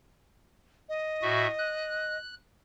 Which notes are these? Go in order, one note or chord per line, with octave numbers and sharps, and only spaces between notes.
D#5
A2 F#4 E5
F#6